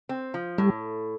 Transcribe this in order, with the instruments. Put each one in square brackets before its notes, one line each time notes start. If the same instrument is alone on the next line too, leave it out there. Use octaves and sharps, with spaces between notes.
[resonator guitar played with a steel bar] C4
F3
[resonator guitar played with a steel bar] A2 [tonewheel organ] G3